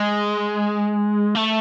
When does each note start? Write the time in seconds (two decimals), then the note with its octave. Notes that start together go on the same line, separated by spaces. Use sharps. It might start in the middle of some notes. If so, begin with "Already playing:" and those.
Already playing: G#3
1.35 A3